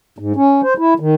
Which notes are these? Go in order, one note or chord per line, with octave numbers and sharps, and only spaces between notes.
G#2
C#4
C5
E4
D#3